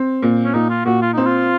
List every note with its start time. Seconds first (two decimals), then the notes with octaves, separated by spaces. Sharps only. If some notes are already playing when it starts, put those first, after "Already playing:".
Already playing: C4
0.22 A#2
0.45 C#4
0.54 A#2 D#4
0.70 F4
0.85 A#2 F#4
1.02 F4
1.13 C4 D#4
1.26 F4